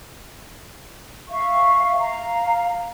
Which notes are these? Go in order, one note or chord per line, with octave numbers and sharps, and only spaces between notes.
E5 F5 C#6
F5 A#5